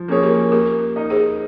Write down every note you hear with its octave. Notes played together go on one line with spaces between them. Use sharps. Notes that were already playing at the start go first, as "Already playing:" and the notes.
Already playing: F3
A#3 C#4 G#4 C#5
G4 A#4
A#3 G4 A#4
D#4 A#4 D#5
G#4 C5